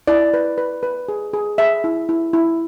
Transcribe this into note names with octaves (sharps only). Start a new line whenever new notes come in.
E4 D5
B4
B4
B4
G#4
G#4
G#4 E5
E4
E4
E4